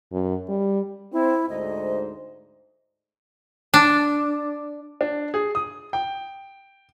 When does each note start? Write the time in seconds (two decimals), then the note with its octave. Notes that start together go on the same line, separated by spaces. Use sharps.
0.12 F#2
0.49 G3
1.13 C4 E4
1.50 D2 G#2 C5 D#5
3.74 D4
5.01 D4
5.34 G#4
5.55 D#6
5.93 G5